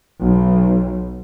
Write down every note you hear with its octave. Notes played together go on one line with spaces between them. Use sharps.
B1